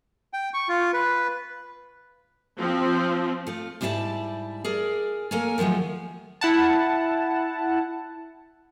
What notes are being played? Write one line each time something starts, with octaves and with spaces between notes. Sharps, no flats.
G5
C#6
F4
B4
F3 C4
A3 F4
G#2 G3 E4 G#4 D5 A5
G#4 A#4 D5
A#3 A4 A#4 C#5 G#5
D#3 F3 F#3 G#3 A3
E4 F#5 A5